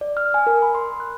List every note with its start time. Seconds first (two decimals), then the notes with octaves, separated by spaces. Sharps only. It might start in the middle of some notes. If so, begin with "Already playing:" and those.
0.01 D5
0.17 F6
0.34 G#5
0.47 A#4
0.62 B5
0.75 C6
1.00 F#6